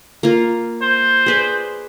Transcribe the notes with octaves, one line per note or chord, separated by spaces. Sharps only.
A#3 F4
C5
G#4 B4 D5